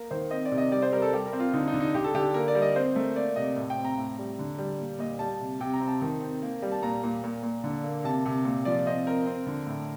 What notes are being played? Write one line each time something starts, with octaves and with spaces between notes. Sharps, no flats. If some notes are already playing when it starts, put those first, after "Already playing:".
Already playing: A#3 A#4
D#3 C5
C4 D#5
D5
C3
D#5
G3 D5
C5
G3 A#4
A4
G3 G4
A#4
C4
F4
D3 D#4
D#4
D3
D#4
D3 G4
A4
D3 G4
A#3 A#4
D5
G3
D#5
C4 C5
A3 A#4
A#3 D5
C3 D#5
A2
G5
C4
A#5
A2
G3
D3
G3
A#2
A#2 D#5
G3 A5
C3
C3 G5
A#5
C4
A5
D#3
C4
A#3
G3
A5
A#2 A#5
A#2
A#2
A#2
D3
A#3
C3 A5
C3
A#2
F3 D5
C4 D#5
C4 A#4
C4
D3
A2